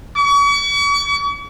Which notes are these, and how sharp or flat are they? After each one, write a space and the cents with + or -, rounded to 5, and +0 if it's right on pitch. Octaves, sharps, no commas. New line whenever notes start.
C#6 +45